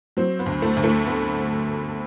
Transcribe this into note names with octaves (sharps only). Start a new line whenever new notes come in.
F#3 C4
B3
D2
A3
D2
A3
B3